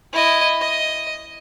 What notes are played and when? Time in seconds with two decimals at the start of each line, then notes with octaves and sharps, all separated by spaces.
0.13 E4 D#5
0.61 D#5